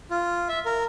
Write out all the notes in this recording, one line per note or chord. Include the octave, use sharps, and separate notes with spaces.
F4
E5
A#4